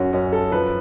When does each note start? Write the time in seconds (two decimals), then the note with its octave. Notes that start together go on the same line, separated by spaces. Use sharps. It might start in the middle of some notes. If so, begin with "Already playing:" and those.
Already playing: F#2 C#4 F#4
0.13 F#2 C#4
0.32 A4
0.52 F3 B4